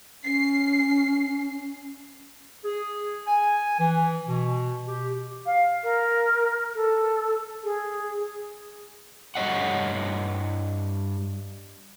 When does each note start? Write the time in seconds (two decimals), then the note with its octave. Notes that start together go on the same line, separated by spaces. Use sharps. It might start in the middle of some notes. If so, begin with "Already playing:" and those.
0.25 C#4 C7
2.64 G#4
3.27 G#5
3.79 E3
4.28 B2
4.87 G4
5.46 F5
5.83 A#4
6.75 A4
7.64 G#4
9.35 G2 C#5 D#5 F#5